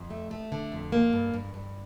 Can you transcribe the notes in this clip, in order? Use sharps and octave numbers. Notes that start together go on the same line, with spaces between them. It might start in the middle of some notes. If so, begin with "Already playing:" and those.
Already playing: F2
A3
A3
D3
F2
A#3
G2
G2
G2